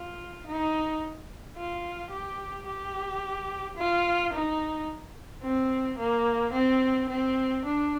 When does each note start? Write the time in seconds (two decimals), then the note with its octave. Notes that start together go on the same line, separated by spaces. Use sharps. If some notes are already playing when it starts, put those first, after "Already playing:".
Already playing: F4
0.47 D#4
1.57 F4
2.11 G4
2.67 G4
3.77 F4
4.33 D#4
5.43 C4
5.99 A#3
6.53 C4
7.09 C4
7.64 D4